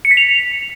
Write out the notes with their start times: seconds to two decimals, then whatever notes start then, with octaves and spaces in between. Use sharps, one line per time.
0.05 C#7
0.11 B6
0.17 F7